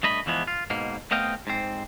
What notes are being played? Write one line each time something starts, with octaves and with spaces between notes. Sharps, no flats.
G2 A3 D#5 B5
E2 E3 F3 G#3 B3
F4
G#2 B2 A#3
A3 B3 C4 D#5 F5 G5
G#2 C4